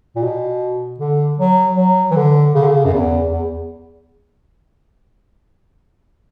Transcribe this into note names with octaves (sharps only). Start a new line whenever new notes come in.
A#2
B2
D3
F#3
F#3
E3
D3
C#3
D3
C#3
F#2
E2
E2